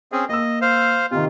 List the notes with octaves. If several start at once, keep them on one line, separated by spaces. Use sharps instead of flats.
C4 C#4 G#4
A#3 D#5 E6
C5 F5
C3 D#3 F4